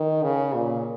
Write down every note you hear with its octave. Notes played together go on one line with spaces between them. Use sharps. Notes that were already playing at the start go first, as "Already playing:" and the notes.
Already playing: D#3
C#3
A#2